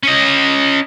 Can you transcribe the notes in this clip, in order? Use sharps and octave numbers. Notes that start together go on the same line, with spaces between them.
C#4 D#5